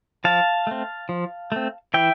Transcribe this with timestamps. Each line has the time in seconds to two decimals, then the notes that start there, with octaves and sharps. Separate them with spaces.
0.24 F3 F5 A5
0.67 A3 C4
1.09 F3
1.52 A3 C4
1.94 E3 E5 G5